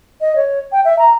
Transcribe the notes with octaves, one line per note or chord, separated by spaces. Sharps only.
D#5
C#5
G5
E5
A#5